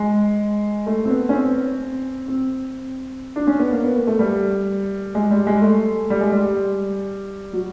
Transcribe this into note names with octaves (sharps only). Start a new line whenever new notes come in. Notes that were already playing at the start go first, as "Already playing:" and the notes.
Already playing: G#3
A3
C4
B3
C#4
C4
C4
D4
C#4
B3
A#3
B3
A#3
A3
G3
G#3
G3
G#3
A3
G3
G#3
G3
F#3